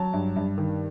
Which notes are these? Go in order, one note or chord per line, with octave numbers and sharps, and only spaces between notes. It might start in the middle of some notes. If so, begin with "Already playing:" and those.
Already playing: F#3 A5
G2
G2
D#3